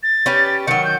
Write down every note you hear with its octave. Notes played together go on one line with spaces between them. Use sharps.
A6
C#4 G4 B4
D#3 F#3 C#7
G6